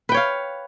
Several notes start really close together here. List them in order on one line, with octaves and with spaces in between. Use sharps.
B4 G5 C#5 F5